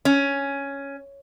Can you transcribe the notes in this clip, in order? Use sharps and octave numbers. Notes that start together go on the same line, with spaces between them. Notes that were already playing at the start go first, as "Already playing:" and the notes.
C#4